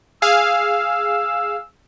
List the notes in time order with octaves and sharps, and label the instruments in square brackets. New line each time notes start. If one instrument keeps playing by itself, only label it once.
[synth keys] G#4 F5 [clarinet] E6